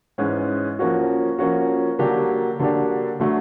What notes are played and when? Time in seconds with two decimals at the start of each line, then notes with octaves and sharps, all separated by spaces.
0.18 G#2 E3 G#3 C#4
0.79 F3 A#3 C#4 F#4
1.39 F3 A#3 C#4 F#4
1.99 D3 F#3 A#3 D4 G4
2.59 D3 F#3 A#3 D4 G4
3.20 D3 F#3 A3